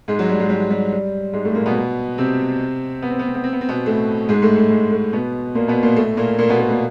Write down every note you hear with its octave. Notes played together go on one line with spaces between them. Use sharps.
G#2 G#3
F#3
G3
G#2 G#3
G3
G3
G3
G#2 G#3
A2 A3
A#2 A#3
B2 B3
C3 C4
B3
C4
B3
C4
B3
C4
B3
C4
B2 B3
A2 A3
G#2 G#3
A2 A3
A2 A3
G#2 G#3
A2 A3
B2 B3
A#2 A#3
B2 B3
A#2 A#3
A2 A3
A#2 A#3
A#2 A#3
B2 B3
A#2 A#3
A#2 A#3